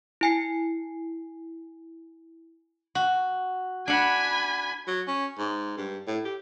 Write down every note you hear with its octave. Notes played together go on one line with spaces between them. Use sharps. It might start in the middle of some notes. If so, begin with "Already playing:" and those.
E4 G#5 C7
F#4
D4 F#5 G#5 B5
F#3
C#4
G#2
G2
A2
G4